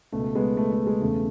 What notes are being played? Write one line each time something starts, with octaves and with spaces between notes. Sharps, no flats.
C#2 B2 A3
G#3 B3
A3
A3
G#3
E1 E2 C#3 A3